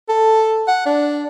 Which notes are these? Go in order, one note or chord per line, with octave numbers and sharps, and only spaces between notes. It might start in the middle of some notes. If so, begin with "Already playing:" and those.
A4
F#5
D4